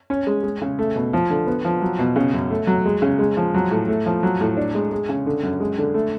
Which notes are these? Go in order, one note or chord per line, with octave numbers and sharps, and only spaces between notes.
C#4
G#3
G#3
C#3
A3
B2
F3
D3
B3
F3
F#3
B2
C#3
F#2
A3
F#3
G#3
C#3
G#3
F3
F#3
A2
A3
F3
F#3
A2
D4
G#3
G#3
C#3
D3
F#2
G#3
D3
A3